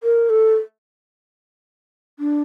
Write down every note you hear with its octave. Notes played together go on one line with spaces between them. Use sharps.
A#4
A4
D4